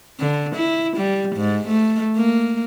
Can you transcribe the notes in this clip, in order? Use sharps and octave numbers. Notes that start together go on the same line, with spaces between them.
D3
E4
G3
G#2
A3
A#3